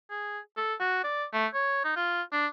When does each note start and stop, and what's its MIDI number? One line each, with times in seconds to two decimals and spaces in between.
0.11 0.39 68
0.57 0.74 69
0.80 1.01 66
1.04 1.25 74
1.33 1.47 57
1.54 1.81 73
1.84 1.92 63
1.96 2.22 65
2.32 2.47 62